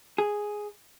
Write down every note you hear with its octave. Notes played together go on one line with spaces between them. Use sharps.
G#4